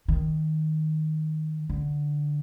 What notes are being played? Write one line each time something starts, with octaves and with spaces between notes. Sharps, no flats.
D#3
D3